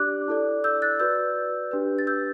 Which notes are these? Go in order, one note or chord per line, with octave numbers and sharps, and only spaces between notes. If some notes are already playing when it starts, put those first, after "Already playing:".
Already playing: D4 G4 D5 D6 F#6
E4 A4 D5
E6 G6
F#6 A6
F#4 B4 D5 E6 G6
D4 G4 B4
A6
E6 G6